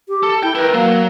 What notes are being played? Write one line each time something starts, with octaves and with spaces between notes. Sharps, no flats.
G4
A4
E4 G5
E4 A#4 B4
F#3 A#3